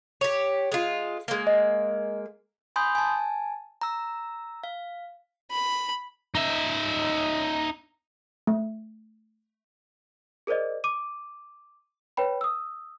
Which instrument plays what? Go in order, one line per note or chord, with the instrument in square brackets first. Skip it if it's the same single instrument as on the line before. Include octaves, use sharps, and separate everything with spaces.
[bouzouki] G4 C#5
G#3 F4
G#3 A#3
[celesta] D#5
[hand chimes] G#5 B5 C6 D#6 G6
G#5 A5
A#5 E6
F5
[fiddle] B5
[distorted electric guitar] D#4 E5
[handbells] A3
[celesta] G#4 A#4 C5 D5 D#5
D6 D#7
B4 C#5 G5 B5
D#6 E6